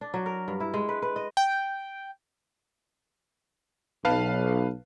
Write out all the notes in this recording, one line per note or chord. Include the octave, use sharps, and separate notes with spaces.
D4
F#3
A#4
G2
E4
G#3
B4
B4
D#5
G5
B1 B4 F5 A5